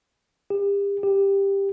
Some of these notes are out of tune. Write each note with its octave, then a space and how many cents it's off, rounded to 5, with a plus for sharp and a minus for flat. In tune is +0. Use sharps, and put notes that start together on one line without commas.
G4 +35
G4 +10